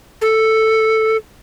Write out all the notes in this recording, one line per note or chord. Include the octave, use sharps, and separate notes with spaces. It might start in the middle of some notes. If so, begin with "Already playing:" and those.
A4